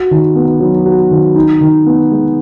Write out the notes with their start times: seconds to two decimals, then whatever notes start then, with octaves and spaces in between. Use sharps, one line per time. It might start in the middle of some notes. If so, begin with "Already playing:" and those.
Already playing: F#4
0.11 D#3
0.36 B3
0.60 F#3
0.86 F#4
1.11 D#3
1.36 D#4
1.61 D#3
1.86 B3
2.11 G#3